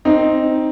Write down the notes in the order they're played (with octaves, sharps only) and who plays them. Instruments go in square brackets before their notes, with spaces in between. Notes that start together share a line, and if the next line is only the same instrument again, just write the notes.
[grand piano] C4 D#4